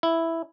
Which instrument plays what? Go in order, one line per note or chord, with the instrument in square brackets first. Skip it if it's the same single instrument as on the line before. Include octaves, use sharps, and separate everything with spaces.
[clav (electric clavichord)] E4